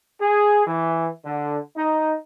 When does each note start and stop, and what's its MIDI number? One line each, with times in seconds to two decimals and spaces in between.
0.19 0.66 68
0.66 1.08 52
1.24 1.58 50
1.75 2.14 63